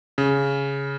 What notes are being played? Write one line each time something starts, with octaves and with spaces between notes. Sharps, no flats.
C#3